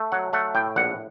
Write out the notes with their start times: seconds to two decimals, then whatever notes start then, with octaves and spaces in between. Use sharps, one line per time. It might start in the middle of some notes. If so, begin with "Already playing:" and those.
Already playing: A3
0.12 F#3 F#5
0.33 A3 F#5
0.55 A2 G5
0.76 A#1 F#5